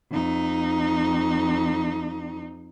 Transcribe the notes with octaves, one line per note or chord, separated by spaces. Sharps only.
F2 D#4